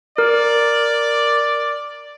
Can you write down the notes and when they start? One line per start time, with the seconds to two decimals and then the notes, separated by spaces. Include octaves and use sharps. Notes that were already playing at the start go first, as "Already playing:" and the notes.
0.18 A#4 D5